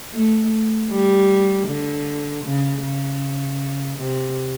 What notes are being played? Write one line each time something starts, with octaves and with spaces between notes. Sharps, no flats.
A3
G3
D3
C#3
C#3
C3